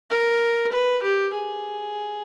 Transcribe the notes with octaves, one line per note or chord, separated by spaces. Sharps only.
A#4
B4
G4
G#4